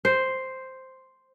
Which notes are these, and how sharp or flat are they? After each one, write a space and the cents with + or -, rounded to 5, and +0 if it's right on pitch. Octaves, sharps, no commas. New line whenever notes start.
C5 +0